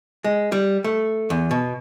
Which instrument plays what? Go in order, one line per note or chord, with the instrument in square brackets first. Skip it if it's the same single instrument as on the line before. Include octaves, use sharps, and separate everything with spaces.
[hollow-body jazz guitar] G#3
G3
A3
E2
B2